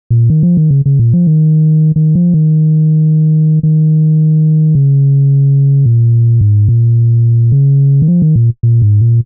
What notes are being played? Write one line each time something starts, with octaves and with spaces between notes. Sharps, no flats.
A#2
D#3
F3
D#3
C#3
C#3
A#2
F3
D#3
D#3
F3
D#3
D#3
C#3
A#2
G#2
A#2
C#3
D#3
F3
D#3
A#2
A#2
G#2
A#2